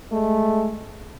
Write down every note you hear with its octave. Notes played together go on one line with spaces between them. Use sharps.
G#3 A3